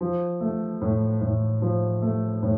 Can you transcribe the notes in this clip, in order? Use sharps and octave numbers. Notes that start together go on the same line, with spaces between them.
F3
A3
A2
A2
F3
A3
A2